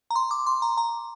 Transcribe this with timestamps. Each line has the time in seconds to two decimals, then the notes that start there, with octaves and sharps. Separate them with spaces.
0.10 A#5
0.16 C6
0.31 D6
0.46 C6
0.62 A#5
0.78 A#5